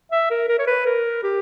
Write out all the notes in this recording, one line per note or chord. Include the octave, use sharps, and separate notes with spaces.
E5
A#4
A#4
C#5
B4
A#4
G4